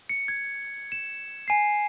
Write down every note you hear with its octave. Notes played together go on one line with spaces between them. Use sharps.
C#7
G#6
E7
G#5 C7